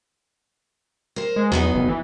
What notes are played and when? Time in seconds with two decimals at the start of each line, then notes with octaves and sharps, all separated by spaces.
1.16 A#4 C5
1.36 G#3
1.52 E2 F#3 B3 D#4
1.75 F#1
1.88 E3